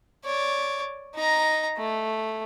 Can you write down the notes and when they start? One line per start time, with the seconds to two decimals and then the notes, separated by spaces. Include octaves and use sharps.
0.24 C#5 D5
1.14 D#4 A#5
1.78 A3